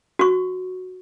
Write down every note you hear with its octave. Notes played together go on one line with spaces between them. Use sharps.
F#4 C#6